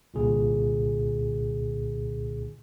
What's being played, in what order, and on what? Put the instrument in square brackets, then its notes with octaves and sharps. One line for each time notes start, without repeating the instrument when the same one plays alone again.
[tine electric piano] C2 A#2 D3 G#4